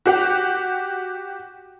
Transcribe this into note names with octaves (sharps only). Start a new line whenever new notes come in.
F#4 G4 F#5